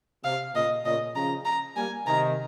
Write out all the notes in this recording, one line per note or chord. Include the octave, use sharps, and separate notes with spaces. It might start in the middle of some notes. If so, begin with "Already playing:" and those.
C3 F5
A#2 C#3 D#5
A#2 C#3 D#5
C#3 F3 A#5
A#5
G3 A#3 G#5
C3 D#3 A#5